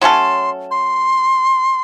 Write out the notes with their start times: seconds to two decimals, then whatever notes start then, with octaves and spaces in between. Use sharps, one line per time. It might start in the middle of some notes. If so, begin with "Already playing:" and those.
0.01 F#3 A3 C#4 A4 C6
0.71 C6